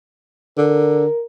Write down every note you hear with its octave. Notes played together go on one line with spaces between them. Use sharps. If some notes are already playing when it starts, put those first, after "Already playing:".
D3 A#4